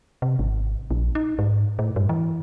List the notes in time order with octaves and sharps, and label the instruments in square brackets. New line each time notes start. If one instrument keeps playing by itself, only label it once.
[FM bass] C3
G#1
A#1
D#4
G#2
A2
G2
E3